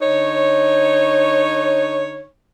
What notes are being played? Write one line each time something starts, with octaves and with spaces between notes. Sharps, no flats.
D3 D#4 C#5